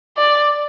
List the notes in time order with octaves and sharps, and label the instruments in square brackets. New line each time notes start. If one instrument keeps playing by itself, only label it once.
[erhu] D5